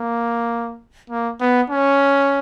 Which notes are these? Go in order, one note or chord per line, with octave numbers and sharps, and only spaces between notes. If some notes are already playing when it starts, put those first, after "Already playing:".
Already playing: A#3
A#3
B3
C#4